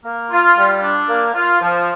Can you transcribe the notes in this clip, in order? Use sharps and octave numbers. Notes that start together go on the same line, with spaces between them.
A#3
F4
G3
D4
A#3
F4
F3